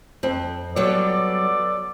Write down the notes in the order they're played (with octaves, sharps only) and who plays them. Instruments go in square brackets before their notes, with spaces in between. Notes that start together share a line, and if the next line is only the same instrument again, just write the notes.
[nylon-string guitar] F2 C4
[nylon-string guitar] F#3 G3 C#5 [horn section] B3 A4 D5